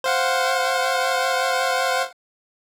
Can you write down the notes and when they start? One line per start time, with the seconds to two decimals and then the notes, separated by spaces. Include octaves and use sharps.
0.04 C5 F5 F#5